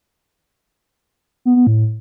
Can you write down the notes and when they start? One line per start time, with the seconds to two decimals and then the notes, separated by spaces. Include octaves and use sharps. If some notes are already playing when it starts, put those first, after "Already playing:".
1.45 B3
1.56 B3
1.67 A2